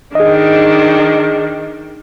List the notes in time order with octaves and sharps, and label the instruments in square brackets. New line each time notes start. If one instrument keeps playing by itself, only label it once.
[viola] D#3 D4 [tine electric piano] G#4 D#5